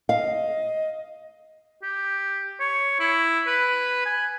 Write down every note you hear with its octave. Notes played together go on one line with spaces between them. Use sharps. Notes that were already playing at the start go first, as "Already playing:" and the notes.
D#5 F5
G4
C#5
E4
B4
G#5